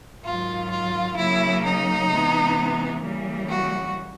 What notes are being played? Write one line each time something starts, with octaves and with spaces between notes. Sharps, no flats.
G#2 D#3 F#3 F4
F4
C#3 F#3 A#3 E4
D#4
C3 E3 G#3 B3
C#3 E3 G3 A#3
F#4